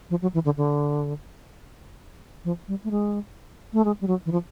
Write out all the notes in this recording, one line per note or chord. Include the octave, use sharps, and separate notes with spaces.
F3
F#3
E3
D3
D3
F3
G3
A3
G#3
A3
G#3
G3
F#3
E3
F3